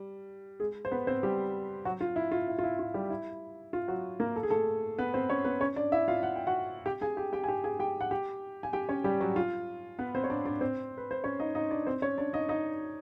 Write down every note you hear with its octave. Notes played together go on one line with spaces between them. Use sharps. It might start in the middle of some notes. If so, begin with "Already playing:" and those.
Already playing: G3
G#3 G#4
C5
B3 B4
C4 C5
G3 G4
F#3 F#4
F4
E4
F4
E4
F4
E4
F4
G3 G4
E4
F4
F#3 F#4
A#3 A#4
A4
G#4
A3 A4
B3 B4
C4 C5
C#4 C#5
B3 B4
C#4 C#5
D4 D5
E4 E5
F4 F5
F#5
G5
F#4 F#5
G4 G5
G#4 G#5
G4 G5
G4 G5
G#5
G4 G5
G#4 G#5
G4 G5
F#5
G4 G5
G#5
G4 G5
C#4 C#5
G3 G4
F#3 F#4
F4
B3 B4
C4 C5
C#5
D4 D5
D4 D5
C4 C5
B4
C5
C#4 C#5
D#4 D#5
D#4 D#5
D4 D5
C4 C5
C#4 C#5
D4 D5
D#4 D#5
D#4 D#5